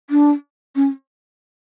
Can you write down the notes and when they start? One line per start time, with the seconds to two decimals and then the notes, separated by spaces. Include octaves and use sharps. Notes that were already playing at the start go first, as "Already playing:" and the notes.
0.10 D4
0.76 C#4